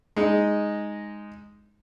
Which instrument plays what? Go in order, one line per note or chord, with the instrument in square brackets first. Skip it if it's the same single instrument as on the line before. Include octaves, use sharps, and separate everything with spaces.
[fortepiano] G#3 D#4